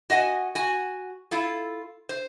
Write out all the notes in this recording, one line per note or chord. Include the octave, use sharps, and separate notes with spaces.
F#4 D#5 F#5 G#5
F#4 G#5
E4 F4 A4
C5